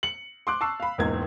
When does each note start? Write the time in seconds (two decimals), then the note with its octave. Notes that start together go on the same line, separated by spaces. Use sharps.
0.03 C#7 F#7
0.47 C6 D6 F#6
0.61 A5 C#6 E6 C7
0.80 F5 B5
0.98 E1 C#2 G#2 A#3 G#6